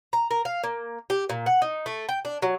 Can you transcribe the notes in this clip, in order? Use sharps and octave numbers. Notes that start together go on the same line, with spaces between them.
A#5
A#4
F5
A#3
G4
A#2
F#5
D#4
A3
G5
D4
F#3